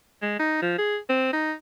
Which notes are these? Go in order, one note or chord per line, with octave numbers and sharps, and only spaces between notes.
G#3
D#4
F3
G#4
C4
D#4